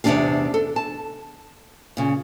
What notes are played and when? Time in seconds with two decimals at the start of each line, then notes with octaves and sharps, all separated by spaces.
0.04 E2 C3 A#3 D4 G4 F5
0.54 A4
0.76 A5
1.97 A#2 C#3